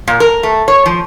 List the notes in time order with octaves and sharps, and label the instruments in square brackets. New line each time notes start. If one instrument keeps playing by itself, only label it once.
[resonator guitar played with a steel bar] A#2
A#4
A3
C#5
F3